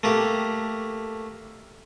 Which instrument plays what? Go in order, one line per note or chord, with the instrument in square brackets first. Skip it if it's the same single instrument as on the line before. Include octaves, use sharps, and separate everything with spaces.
[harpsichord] A3 A#3 G4